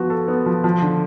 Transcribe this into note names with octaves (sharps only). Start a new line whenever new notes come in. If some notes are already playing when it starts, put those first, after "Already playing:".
Already playing: F3 B3 F#4
A4
B3
F3
F3
D3